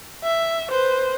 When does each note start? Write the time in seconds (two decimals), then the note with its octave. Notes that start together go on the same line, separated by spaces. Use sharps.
0.24 E5
0.70 B4 C5